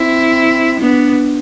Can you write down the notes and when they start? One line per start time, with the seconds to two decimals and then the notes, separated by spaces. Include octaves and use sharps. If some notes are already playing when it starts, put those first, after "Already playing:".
Already playing: C4 E4
0.80 B3 D4